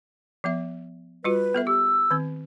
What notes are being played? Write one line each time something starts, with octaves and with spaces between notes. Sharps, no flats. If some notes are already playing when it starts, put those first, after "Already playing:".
F3 B3 E5
G3 F4 F#4 B4
B3 A4 E5
G4 E6
D#3 C4